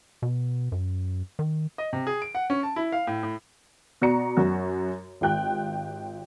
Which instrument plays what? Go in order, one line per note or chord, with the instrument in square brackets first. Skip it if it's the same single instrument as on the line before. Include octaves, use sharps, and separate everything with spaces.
[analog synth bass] B2
F#2
D#3
[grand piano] D#5
C3
G#4
D7
F#5
C#4
A5
E4
F5
A2
A2
[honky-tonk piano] B2 F#4 D5 A#5 C#7
F#2 F#4
G#1 F4 G4 G5 F#6